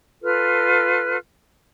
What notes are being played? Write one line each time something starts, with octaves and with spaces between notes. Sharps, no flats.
F4 A4 B4 F6